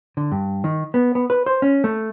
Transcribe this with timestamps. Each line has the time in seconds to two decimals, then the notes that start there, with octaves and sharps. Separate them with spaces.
0.17 D3
0.32 G2
0.64 D#3
0.94 B3
1.15 B3
1.30 B4
1.46 C5
1.62 C#4
1.84 A3